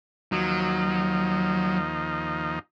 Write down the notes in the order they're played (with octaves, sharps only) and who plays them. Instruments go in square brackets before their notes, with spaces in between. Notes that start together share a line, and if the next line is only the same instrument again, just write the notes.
[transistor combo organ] D#2 F3 D#4 [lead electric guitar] F#3